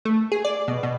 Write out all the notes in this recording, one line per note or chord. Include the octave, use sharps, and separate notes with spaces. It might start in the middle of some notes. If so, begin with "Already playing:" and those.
A3
G#4
D5
B2
B2